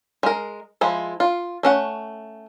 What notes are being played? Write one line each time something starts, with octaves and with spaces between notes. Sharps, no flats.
G#3 A#4
F3 G#3 E4
F4
A3 C#4 F#5